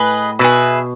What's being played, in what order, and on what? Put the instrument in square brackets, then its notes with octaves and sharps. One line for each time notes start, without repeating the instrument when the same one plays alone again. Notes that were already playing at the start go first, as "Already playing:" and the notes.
Already playing: [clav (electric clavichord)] A2 [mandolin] G#4 B4 D#5
[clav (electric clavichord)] B2 [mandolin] G#4 B4 E5